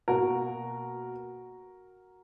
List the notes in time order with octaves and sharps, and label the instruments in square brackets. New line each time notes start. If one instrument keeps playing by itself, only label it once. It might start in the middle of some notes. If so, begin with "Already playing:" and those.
[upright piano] B2 A#3 F#4 A#4